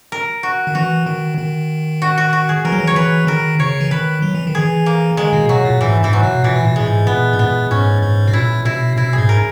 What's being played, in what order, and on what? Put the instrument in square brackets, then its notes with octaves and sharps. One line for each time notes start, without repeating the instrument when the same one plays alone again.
[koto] A#4
F#4
[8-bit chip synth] D#3
[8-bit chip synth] E3 [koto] F#4
[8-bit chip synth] D#3
D#3
[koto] F#4
F#4
F#4
G#4
[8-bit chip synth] E3 [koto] A#4
[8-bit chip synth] F#3
E3
[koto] C#5
[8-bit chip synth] E3 [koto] B4
[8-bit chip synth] D#3 [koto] A#4
[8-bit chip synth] C#3 [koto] C#5
[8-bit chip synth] E3
[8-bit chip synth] D#3 [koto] B4
[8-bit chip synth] F#3
E3
D#3
[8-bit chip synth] E3 [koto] G#4
[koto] A#3
[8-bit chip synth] D#3 [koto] G#3
[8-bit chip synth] B2
[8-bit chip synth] B2 [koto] F#3
[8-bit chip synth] A#2
[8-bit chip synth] G#2 [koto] E3
[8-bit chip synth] G#2 [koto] E3
[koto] F#3
[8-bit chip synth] B2
[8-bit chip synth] A#2 [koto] E3
[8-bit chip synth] B2
A#2
[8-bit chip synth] A#2 [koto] G#3
[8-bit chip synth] G#2
[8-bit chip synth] A#2 [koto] B3
[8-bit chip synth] G#2
[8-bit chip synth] A#2 [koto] B3
[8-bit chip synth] G#2 [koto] C#4
[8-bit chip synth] G#2
B2
[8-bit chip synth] A#2 [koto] E4
[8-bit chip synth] B2 [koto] E4
[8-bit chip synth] B2 [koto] E4
[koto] G#4
[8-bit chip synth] G#2
[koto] A#4